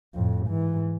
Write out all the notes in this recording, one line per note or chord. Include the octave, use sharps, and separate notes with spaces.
F2 A2
G#2 E3